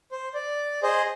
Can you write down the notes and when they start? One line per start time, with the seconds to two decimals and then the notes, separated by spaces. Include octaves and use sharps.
0.12 C5
0.34 D5
0.83 G#4 C5 D#5